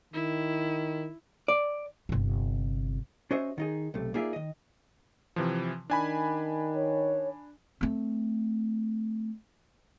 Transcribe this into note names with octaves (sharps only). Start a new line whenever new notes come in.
D#3 E4
D5
G1 C3
C#4 F#4 C5 D#5 E5
D#3 D#4 G#4
B1 C3 A3
A#3 D#4 F4 G#4 D5 E5
D#3 D#5
C3 E3 F3
D#3 D4 G#5 B5
C#5
A3 C4